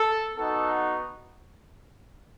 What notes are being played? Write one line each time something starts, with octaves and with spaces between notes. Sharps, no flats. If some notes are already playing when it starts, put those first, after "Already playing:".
Already playing: A4
B3 D#4 F#4 A4